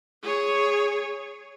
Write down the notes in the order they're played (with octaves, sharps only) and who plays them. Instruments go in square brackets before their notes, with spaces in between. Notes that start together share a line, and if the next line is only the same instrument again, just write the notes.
[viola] G#4 C#5